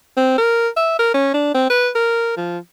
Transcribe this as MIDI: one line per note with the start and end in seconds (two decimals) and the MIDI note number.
0.17 0.36 60
0.37 0.68 70
0.76 0.97 76
0.99 1.13 70
1.14 1.29 61
1.34 1.53 62
1.54 1.65 60
1.70 1.89 71
1.95 2.36 70
2.37 2.58 53